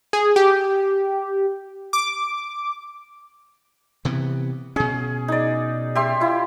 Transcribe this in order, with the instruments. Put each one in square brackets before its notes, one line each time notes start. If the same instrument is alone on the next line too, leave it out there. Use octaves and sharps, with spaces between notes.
[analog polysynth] G#4
G4
D6
[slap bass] C3 E3 B3
[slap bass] B2 C#4 [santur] G#4
[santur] D#4 D5
G4 E5 C6
E4 F4